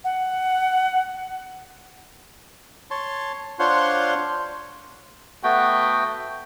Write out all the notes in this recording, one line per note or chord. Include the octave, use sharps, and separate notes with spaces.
F#5
C#5 A5 C6
D4 F4 C5 C#5 F#5 C6
A3 B3 F#4 G5